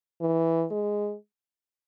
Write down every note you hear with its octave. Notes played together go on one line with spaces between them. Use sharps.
E3
G#3